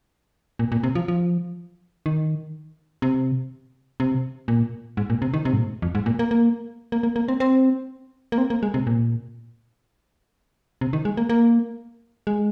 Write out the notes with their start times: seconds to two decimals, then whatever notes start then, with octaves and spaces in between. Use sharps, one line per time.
0.59 A#2
0.72 A#2
0.83 C3
0.95 F3
1.08 F3
2.06 D#3
3.02 C3
4.00 C3
4.48 A#2
4.97 G#2
5.10 A#2
5.22 C3
5.34 D#3
5.45 C3
5.53 G#2
5.58 A#2
5.82 F2
5.95 G#2
6.06 A#2
6.19 A#3
6.31 A#3
6.92 A#3
7.03 A#3
7.16 A#3
7.28 C4
7.40 C4
8.32 A#3
8.38 C4
8.50 A#3
8.63 G#3
8.74 C3
8.87 A#2
10.81 C3
10.93 D#3
11.05 G#3
11.17 A#3
11.29 A#3
12.27 G#3